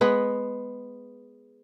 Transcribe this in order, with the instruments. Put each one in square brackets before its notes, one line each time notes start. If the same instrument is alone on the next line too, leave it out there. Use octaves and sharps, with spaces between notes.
[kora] G#3 B3 B4